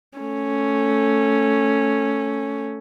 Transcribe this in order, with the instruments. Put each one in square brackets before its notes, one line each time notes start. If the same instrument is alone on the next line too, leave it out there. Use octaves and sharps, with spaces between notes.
[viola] A3 C#4